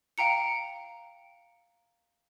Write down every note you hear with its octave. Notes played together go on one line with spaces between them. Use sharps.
F5 G5 A#5 C#7